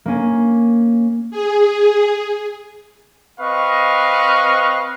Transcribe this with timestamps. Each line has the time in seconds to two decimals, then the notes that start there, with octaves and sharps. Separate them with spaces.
0.06 A#3 C#4
1.31 G#4
3.39 C4 B4 D#5 F5 C#6